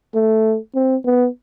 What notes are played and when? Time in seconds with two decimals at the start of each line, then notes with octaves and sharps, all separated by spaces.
0.14 A3
0.75 C4
1.05 B3